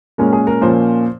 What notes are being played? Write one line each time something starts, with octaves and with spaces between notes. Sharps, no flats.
A#2 G#3 C#4 A#4
G#4
A#4
A#2 F3 A#3 C#4 C5